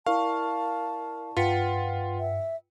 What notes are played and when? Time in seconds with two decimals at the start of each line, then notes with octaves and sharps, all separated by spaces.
0.06 E4 A#4 D5 F5 A5 C#6
1.37 G2 F4 B4 F#5 G5 B6 C#7
2.19 E5